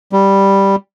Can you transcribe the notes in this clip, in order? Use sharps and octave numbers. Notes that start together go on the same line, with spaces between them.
G3